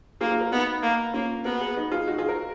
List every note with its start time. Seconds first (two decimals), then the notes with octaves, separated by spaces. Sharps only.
0.21 A#3 F4 G#4
0.31 F4 G#4
0.41 F#4 A#4
0.52 B3 D#4 F#4
0.83 A#3
1.14 A#3 C#4 F4
1.45 B3 F#4 A#4
1.61 G#4 B4
1.77 D#4 F#4
1.92 F4 G#4
2.08 D#4 F#4
2.18 F4 G#4
2.28 F#4 A#4